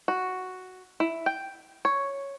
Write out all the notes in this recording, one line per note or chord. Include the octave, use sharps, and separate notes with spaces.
F#4
E4
G5
C#5